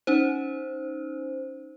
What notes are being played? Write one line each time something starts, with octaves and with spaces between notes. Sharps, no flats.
C#4 D#4 C5